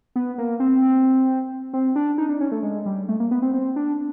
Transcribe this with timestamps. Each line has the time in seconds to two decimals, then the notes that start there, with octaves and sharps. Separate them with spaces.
0.16 B3
0.38 A#3
0.60 C4
1.73 C4
1.96 D4
2.18 D#4
2.29 D4
2.40 C#4
2.52 A3
2.63 G#3
2.86 G3
3.09 A3
3.20 A#3
3.31 B3
3.42 C4
3.54 C4
3.76 D4